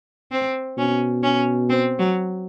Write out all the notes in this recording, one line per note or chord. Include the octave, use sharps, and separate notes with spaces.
C4
B2 C#4
C#4
C4
F#3